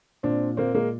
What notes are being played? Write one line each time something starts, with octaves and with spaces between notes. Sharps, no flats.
A#2 C4 D4
A#3 C4
G#3 A#3